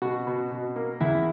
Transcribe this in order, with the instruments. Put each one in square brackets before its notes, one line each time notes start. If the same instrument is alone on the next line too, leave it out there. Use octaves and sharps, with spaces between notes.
[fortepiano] B2 [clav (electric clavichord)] F#4
[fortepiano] B2
B2
A#3
[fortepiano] E2 [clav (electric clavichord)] E4